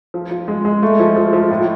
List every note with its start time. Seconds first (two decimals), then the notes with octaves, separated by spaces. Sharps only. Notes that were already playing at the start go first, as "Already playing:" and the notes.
0.14 F3
0.31 F3
0.48 G#3
0.65 G#3
0.83 A3
1.00 F3
1.17 F3
1.33 F3
1.50 A2